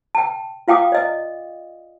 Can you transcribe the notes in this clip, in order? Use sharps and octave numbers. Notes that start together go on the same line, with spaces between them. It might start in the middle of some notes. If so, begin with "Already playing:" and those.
G5 A5
F4 F5 G5 D6 D#6
D5 D#5